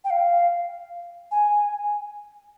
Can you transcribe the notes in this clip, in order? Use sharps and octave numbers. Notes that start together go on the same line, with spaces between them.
G5
F5
G#5